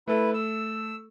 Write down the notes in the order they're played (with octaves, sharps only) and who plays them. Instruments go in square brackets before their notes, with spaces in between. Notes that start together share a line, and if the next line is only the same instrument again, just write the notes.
[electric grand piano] A3 A4 [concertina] E4 B4
[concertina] E6